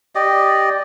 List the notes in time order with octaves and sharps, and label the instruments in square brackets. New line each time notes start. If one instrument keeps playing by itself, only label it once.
[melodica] G4 D5 D#5